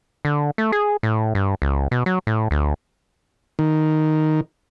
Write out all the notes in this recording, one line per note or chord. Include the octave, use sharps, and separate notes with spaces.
D3
A3
G#4
A2
G2
C#2
B2
F#3
A2
D2
D#3